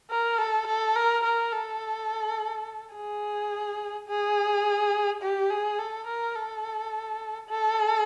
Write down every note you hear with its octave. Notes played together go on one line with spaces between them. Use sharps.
A#4
A4
A4
A#4
A#4
A4
G#4
G#4
G4
G#4
A4
A#4
A4
A4